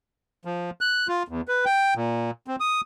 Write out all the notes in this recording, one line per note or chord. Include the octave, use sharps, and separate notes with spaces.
F3
F#6
F4
E2
B4
G5
A#2
C4
D#6